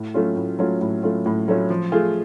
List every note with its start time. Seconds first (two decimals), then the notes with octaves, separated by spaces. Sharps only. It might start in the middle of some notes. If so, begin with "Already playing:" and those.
Already playing: A2
0.14 F#3 A3 C#4 F4
0.36 A2
0.59 F#3 A3 C#4 F4
0.81 A2
1.03 F#3 A3 C#4 F4
1.26 A2
1.48 F#3 A3 C#4 F4
1.70 F3
1.92 A3 F4 G#4